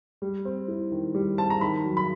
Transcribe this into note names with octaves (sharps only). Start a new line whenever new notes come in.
G3
C4
E4
D#3
G3
C4 A5
A#5
D#3 B5
F#3
B5